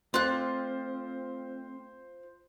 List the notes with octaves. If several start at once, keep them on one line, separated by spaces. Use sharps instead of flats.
A3 C4 F4 C5 F5 F#6